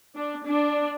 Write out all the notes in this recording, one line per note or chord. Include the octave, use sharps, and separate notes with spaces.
D4
D4